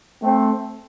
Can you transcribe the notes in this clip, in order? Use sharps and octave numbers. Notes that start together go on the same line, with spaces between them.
A3 C4